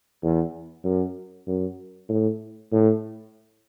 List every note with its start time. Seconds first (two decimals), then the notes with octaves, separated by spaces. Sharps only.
0.22 E2
0.84 F#2
1.47 F#2
2.09 A2
2.72 A2